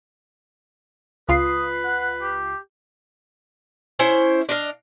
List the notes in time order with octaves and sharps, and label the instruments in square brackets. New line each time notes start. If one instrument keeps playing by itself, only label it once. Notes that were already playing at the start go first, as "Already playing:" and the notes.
[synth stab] C#2 F4 C7 [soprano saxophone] B4 [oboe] D#6
[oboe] F#5
G4
[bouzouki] C#4 E4 C5
D4 D#5 F5